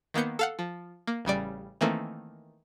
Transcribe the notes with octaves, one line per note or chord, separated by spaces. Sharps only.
D#3 A#3 B3 G6 C#7
A4 F5 F#5
F3
A#3
A1 C#3 G3 D5
D#3 E3 A3 A#3 C4